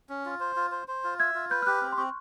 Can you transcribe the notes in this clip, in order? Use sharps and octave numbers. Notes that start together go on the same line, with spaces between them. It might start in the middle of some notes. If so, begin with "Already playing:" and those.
C#4
F4
C5
F4
C5
C5
F4
E5 G#6
F4
B4 G6
F6
G4 F#6
C4 F6
C6
C4 C#6